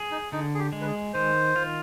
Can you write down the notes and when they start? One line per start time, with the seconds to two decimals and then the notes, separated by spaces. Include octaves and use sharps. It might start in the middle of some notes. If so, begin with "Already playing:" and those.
Already playing: G#4
0.11 D#4
0.32 D3 D#4
0.55 G#4
0.59 G4
0.73 G#3
0.81 B4
0.87 G#4
1.14 D#3 C5
1.56 F4